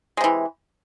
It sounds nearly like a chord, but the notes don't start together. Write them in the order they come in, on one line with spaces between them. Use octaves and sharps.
G#3 C3 E3